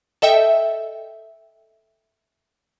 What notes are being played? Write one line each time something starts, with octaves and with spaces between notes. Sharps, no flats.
A4 D#5 E5 G5